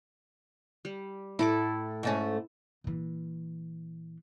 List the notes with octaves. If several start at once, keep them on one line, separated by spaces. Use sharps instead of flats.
G3
A2 E4 A4 D6
G#2 A3 C#4
A#2 E3